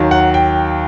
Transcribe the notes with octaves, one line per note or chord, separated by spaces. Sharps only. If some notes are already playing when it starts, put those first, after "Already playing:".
Already playing: D#2 D#3 F#3
F#5
G5